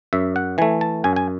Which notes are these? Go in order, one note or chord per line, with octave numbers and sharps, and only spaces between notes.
F#2 E5
F#5
E3 A3 G#5
A5
F#2 G#5
G#5